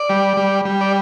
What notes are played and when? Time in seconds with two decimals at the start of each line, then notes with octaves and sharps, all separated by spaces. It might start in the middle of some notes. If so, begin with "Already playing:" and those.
Already playing: D5
0.10 G3
0.37 G3
0.65 G3
0.81 D5